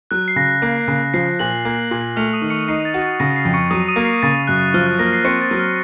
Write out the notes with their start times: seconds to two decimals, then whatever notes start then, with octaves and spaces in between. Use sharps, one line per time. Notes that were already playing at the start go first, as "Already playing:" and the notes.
0.11 F#3 F#6
0.28 C7
0.36 C#3 A#6
0.62 A#3
0.88 C#3
1.14 F3 C7
1.39 A#2 F#6 F#7
1.65 A#3
1.91 A#2
2.16 A3 F6 F7
2.33 D#6 D#7
2.42 D#3
2.50 C#6 C#7
2.68 D#4 C7
2.85 A6
2.94 F#4
3.02 A6
3.20 C#3 A#6
3.36 C7
3.45 F2
3.54 C#6 C#7
3.70 F#3 D#6 D#7
3.88 D#6 D#7
3.96 A#3
4.05 C7
4.23 C#3 A6
4.47 F#2 F#6
4.74 F3 F6
4.87 F#6
4.99 A#3 A#6
5.13 C7
5.25 C4 C#6 C#7
5.42 A6
5.51 F#3
5.59 F6